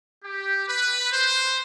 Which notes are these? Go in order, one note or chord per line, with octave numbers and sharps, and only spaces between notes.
G4
B4
C5